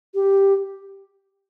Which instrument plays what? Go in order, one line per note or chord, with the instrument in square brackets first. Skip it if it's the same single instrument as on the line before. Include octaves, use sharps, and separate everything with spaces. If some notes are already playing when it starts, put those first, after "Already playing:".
[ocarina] G4